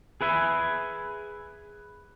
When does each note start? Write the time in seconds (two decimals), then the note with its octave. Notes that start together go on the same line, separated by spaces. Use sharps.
0.21 G#4 B4 E5 G#5